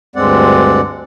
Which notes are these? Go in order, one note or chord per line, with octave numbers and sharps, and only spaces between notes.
D2 G2 G#3 C4 D5 F#5